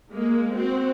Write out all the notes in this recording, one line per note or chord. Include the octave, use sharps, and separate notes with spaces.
G#3 A#3
C4 F#4